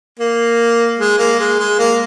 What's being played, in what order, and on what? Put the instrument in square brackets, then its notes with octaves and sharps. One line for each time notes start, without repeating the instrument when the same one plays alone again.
[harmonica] A#3
G#3
A#3
G#3
G#3
A#3